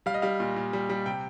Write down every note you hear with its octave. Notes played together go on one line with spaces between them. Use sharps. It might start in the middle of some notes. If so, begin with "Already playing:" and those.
G3 F5
D#5
G3 F5
A#2
A#2
G3
G3
C3 G5